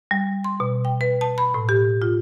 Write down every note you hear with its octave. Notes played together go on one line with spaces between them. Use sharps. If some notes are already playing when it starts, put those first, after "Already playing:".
G3
C6
B2
G5
B4
A5
B5
A2
G4
F4